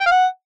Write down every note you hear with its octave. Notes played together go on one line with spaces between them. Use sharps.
G5
F5
F#5